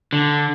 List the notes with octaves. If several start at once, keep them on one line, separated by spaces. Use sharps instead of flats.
D3